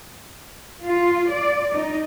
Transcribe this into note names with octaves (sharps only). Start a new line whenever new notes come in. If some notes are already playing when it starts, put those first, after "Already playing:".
F4
D5
D#4